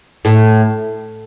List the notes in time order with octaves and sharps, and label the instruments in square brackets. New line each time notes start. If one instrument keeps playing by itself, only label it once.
[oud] A2